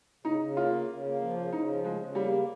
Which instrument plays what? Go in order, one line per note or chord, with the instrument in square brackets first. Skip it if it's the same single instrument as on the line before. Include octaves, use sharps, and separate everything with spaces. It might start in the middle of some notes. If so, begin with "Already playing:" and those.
[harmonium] C#3 [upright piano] D#4
[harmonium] C#3
[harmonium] A#3 [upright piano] F4
[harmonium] C#3
C#3
A#3
F3
C#3
[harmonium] C#3 [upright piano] D#4
[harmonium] F3
[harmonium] C#3 [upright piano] G#3
[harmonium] C#3
[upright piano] G3 [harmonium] A#3
[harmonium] C#3